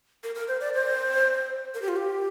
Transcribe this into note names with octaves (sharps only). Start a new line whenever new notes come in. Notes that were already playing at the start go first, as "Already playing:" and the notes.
A#4
A#4
C5
D5
C5
A#4
G4
F4
G4